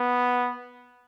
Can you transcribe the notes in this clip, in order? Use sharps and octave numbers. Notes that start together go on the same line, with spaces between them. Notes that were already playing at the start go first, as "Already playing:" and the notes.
Already playing: B3